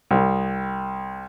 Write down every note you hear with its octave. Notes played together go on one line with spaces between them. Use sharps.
C2